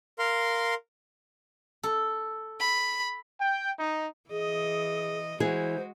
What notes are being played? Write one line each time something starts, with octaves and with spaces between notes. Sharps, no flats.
A#4 F5 C6
A4
B5
G5
D#4
E3 G#4 D#5
E3 G#3 E4 F#4 G#4 C5